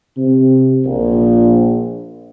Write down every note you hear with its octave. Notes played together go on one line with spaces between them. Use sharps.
C3
A#1